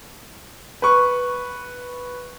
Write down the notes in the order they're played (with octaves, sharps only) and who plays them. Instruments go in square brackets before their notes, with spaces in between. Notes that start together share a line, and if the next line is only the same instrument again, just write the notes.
[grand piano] B4 C#6